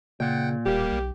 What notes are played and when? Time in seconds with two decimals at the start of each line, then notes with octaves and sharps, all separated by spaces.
0.20 A#2 C#3 F#5 G5
0.66 D1 G3 A#3 G4
0.92 B1